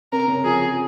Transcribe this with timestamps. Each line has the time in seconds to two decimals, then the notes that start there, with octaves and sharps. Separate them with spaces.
0.12 C3 C4 A#4
0.28 C#3 C#4
0.44 F3 F4 G#4